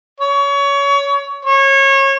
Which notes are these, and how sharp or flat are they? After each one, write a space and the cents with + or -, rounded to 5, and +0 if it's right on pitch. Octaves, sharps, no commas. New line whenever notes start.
C#5 +25
C#5 -25